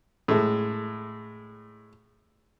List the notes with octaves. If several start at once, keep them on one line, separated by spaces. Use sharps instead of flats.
A2 G#3